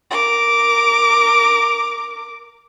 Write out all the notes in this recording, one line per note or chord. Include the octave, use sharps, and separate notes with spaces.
A#4 D6